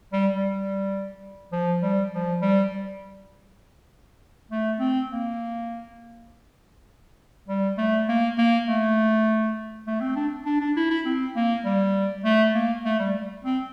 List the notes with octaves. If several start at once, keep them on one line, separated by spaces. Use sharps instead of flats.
G3
G3
F3
G3
F3
G3
A3
C4
A#3
G3
A3
A#3
A#3
A3
A3
C4
D4
D4
D4
E4
E4
C4
A#3
G3
A3
A#3
A3
G3
C4